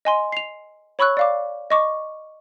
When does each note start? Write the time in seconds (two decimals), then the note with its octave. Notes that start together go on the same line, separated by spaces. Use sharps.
0.05 D#5 G#5 C6
0.32 C7 F7
0.99 C#5 B5 C#6 E6 F#6
1.17 D5 F5 D6
1.70 D#5 C#6 D6